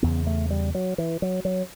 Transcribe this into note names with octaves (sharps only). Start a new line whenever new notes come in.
E2 C#3 B3
A3
G3
F#3
E3
F#3
F#3